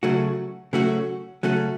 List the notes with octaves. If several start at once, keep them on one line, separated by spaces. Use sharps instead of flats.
C#3 F#3 A3 C#4 F#4
C#3 F#3 A3 C#4 F#4
C#3 F#3 A3 C#4 F#4